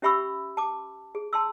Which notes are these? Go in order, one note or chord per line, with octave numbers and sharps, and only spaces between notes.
C#4 G4 E5 B5 C#6 E6
A5 D6
G#4
A5 C6 E6